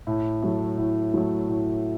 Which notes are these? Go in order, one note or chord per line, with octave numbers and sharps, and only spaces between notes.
A2
F#3 A3
A2
F#3 A3
A2